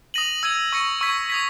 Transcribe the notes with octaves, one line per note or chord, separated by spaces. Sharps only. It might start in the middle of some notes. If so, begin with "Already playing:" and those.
D#6 A#6 D#7 F#7
E6 G#6 D#7 F#7
C#6 E6 A#6 C#7
C#6 E6 G#6 B6
D#6 G#6 B6